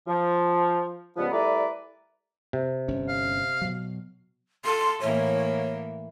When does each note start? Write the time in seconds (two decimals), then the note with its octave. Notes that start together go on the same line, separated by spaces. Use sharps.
0.08 F3
1.17 C#2 F3 G3 B3
1.32 G3 A3 E4 A#4 B4 D5
2.53 C3
2.88 G1 C#4
3.09 F5
3.62 B2 F#3
4.65 A4 C6
5.01 A2 E3 A#3 C#5